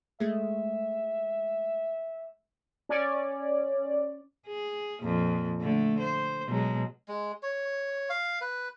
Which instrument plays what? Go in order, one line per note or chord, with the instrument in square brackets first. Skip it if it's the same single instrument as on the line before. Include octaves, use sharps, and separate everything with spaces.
[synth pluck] G#3 A3 [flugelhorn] E5
[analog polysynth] C#4 D5
[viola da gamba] G#4
F2 A#2
D3 A3
C5
B2 F#3 G#3
[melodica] G#3
C#5
F5
B4